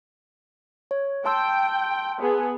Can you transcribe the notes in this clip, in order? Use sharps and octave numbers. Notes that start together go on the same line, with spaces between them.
C#5
G5 A5 C6 E6
B3 G#4